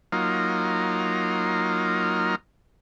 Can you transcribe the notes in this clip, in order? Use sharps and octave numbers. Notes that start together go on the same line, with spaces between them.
F#3 A#3 D#4 F4